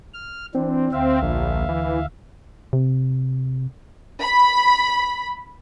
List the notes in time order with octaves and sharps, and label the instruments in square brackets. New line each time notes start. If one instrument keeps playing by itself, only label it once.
[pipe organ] F6
[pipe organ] E3 D4 [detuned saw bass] C4
[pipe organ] D2 E5 F5
[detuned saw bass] A#1
E3
[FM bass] C3
[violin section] B5